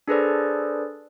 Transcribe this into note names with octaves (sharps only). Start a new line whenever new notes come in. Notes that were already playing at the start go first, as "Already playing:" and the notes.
D4 G#4 A4 B4 C5 D5